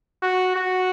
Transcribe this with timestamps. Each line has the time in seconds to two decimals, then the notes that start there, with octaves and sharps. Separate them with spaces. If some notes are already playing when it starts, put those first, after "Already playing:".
0.22 F#4
0.56 F#4